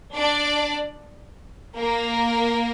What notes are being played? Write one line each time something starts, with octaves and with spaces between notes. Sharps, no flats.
D4 D5
A#3 A#4